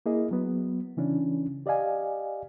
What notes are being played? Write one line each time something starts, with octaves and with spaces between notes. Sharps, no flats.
A#3 E4 G#4 D#5
F#3 B3
C#3 E3 C#4 D4
G4 D5 D#5 F5 G#5